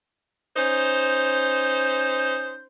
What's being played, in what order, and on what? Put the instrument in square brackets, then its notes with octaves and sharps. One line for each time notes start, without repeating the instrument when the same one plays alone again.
[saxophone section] C#4 D#4 C5